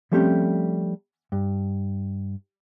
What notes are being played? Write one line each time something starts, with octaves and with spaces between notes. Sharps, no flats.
F3 G3 A3 C4 C#4 G4
G2